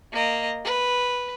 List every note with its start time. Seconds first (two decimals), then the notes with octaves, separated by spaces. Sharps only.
0.12 A#3 D#5
0.65 B4